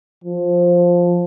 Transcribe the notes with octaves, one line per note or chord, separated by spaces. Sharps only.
F3